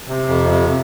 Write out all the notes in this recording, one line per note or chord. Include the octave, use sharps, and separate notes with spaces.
C3
F2
C3